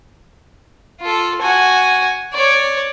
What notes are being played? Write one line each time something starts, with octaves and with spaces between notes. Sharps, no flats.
F4 A4
F#4 G#5
C#5 D5